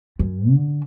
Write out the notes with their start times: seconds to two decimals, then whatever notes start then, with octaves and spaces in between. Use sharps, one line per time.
0.19 F#2
0.50 D3